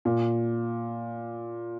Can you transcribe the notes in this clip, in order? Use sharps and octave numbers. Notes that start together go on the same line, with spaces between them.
A#2